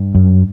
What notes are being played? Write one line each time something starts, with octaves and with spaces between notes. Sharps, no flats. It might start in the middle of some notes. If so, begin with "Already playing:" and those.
Already playing: G2
F#2